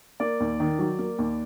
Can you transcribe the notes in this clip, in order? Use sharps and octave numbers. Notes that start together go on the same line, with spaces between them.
A#3 D5
D#2
D#3
F#3
A#3
D#2